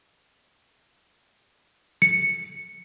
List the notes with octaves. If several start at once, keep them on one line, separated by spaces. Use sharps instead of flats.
C#7